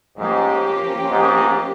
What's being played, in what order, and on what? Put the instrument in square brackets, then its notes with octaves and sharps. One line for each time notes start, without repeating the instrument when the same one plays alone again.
[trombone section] G#2 [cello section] F3 A#3 C#4 G4
[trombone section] G#2